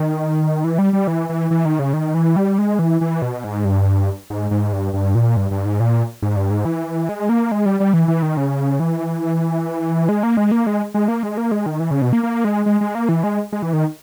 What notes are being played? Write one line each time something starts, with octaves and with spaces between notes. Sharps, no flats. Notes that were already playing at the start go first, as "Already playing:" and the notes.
Already playing: D#3
E3
G3
G3
E3
E3
E3
D#3
C#3
D#3
E3
G3
G#3
E3
E3
B2
G#2
G2
G#2
G#2
G2
G2
A#2
G2
G2
G#2
A#2
G#2
G2
G#2
E3
G#3
A#3
G#3
G3
G3
E3
E3
D#3
C#3
E3
G#3
A#3
G#3
A#3
G#3
G#3
A#3
G#3
A#3
G#3
D#3
E3
C#3
B2
A#3
A#3
G#3
G#3
G#3
A#3
E3
G#3
G#3
E3
D#3